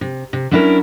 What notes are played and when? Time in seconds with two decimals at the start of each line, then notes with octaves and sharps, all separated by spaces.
0.01 C3
0.33 C3
0.51 F#3 C#4 D4 E4 G4 A#4